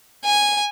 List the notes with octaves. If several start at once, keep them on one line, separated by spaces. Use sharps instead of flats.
G#5